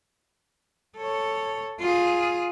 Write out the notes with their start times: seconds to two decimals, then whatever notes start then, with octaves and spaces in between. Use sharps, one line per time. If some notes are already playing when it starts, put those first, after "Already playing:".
0.98 A4 C#5
1.80 F4 G#4